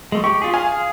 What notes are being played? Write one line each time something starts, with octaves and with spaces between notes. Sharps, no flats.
G#3 A3
G4 C#6
F4 G#4
G#4 F5 G#5